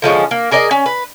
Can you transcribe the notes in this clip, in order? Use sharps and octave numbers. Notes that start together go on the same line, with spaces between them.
D3 F3 G#3 C#4
A#3
G#4 A#4 D5 D#5
C#4
B4